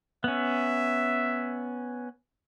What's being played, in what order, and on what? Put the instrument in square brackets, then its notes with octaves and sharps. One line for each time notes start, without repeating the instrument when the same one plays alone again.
[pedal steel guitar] B3 C#4 [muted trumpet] E5